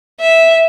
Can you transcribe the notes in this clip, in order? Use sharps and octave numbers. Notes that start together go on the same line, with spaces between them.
E5